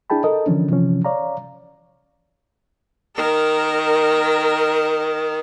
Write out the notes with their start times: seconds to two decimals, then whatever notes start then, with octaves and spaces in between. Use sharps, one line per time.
0.10 D4 E4 G#4 G5 A5 B5
0.24 A4 A#4 D#5
0.46 D3 E3 F3 C#4 D4
0.69 C3 E3 F3 C#4
1.05 C#5 D5 F5 A#5
3.16 D#3 A#4